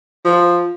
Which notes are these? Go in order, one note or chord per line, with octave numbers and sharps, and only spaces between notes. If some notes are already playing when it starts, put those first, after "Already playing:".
F3